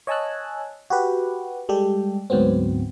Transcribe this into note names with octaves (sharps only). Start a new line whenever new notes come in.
C#5 D#5 G#5 A5 E6 F#6
F#4 G4 B4
G3 G#3 G4 A4
D2 G#2 F#3 B3 C4